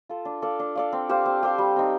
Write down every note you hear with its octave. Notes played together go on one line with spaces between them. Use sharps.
F4 A4
D4
A4 D5 F5
D4
A4 D5 F5
C4
G4 C5 F5
C4
G4 C5 F5
G3
C4 D#4